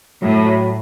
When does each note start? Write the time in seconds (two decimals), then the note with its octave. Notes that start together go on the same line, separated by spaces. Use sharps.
0.22 A2 F#3
0.46 F#3